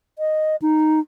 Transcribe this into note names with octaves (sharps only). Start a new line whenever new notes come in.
D#5
D#4